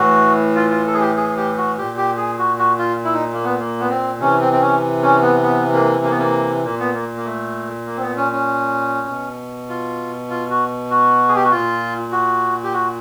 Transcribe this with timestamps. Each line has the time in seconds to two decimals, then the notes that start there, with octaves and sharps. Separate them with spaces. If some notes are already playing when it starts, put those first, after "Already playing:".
Already playing: A2 E3 F#4
0.56 F4
0.71 F4
0.87 A4
0.94 G#4
1.00 G4
1.17 G#4
1.37 G4
1.57 F#4
1.77 A#2 G4
1.97 G4
2.17 G#4
2.39 F#4
2.59 F#4
2.79 F4
3.04 E4
3.14 D#4
3.33 A#3
3.44 B3
3.60 A#3
3.80 B3
3.90 C4
4.20 C3 E3 C#4
4.41 C4
4.53 C4
4.61 C#4
5.02 C#4
5.22 B3
5.43 B3
5.73 A#3
6.04 A#3
6.11 B3
6.18 A#3
6.64 A#2 A#3
6.80 B3
6.94 A#3
7.17 A#3
7.25 A3
7.86 A#3
7.97 C4
8.02 B3
8.17 C#4
8.32 C#4
9.07 B2
9.69 F4
10.30 F4
10.50 F#4
10.90 F#4
11.28 G#4
11.36 G4
11.44 F#4
11.51 A#2 F4
12.12 F#4
12.64 G4
12.73 F#4